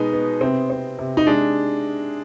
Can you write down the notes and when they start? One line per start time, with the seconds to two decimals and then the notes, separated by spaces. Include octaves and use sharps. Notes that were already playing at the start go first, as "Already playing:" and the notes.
Already playing: B2 G#3 B3 D#4
0.13 B3
0.41 C3 C4
0.70 C4
0.99 C3
1.17 D#4
1.27 G#3 D4